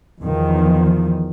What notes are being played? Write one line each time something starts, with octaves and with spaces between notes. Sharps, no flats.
E2 D#3 F3